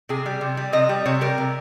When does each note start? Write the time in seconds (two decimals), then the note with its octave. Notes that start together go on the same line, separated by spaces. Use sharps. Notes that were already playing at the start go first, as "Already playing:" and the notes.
0.09 C3 G#4
0.26 G3
0.41 C3
0.57 G3
0.73 C3 D#5
0.89 G3
1.06 C3 C#5
1.21 G3 A#4
1.38 C3